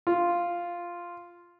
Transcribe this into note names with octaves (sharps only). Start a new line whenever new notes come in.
F4